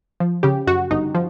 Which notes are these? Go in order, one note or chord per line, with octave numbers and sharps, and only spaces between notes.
F3
C#3 G4
F#2 F#4
G1 D#4
F3